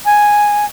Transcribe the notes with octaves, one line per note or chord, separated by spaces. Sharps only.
G#5